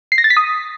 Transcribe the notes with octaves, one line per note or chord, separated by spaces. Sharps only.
C7
A#6
A6
B6
D#6